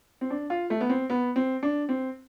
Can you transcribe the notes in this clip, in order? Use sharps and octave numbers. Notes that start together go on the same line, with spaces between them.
C4
D4
F4
A3
B3
C4
B3
C4
D4
C4